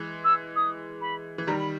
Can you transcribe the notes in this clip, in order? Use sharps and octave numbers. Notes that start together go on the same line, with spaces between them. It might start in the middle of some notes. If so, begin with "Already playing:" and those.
Already playing: E3 G#3
E6
D#6
B5
E3
D#3 G3 A#5
B5